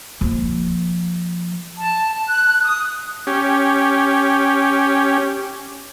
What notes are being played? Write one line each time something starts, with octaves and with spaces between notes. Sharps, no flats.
F3 A#3
A5
F#6
F#6
D#6
C#4 G4